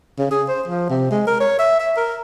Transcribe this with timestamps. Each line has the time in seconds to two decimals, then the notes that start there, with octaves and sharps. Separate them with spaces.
0.19 C#3
0.31 G#4
0.48 C5
0.68 F3
0.90 C3
1.11 G#3
1.27 A#4
1.40 C#5
1.59 E5
1.80 E5
1.96 A#4